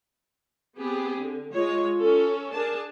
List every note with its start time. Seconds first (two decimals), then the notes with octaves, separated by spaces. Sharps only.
0.78 B3 C4 G4 G#4
1.17 D3
1.55 G#3 F4 C#5
1.99 C#4 A4
2.54 D4 G#4 A#4 A5